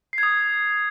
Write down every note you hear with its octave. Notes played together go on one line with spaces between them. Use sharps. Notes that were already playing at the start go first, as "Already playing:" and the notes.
C7
G#6
D#6